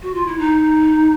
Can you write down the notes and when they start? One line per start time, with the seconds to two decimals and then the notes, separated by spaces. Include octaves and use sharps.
0.03 F#4
0.15 F4
0.27 E4
0.39 D#4